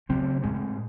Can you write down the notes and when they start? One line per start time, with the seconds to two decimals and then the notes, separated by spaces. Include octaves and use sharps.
0.09 C#3 F#3 A3 C4
0.43 A2 G#3 C4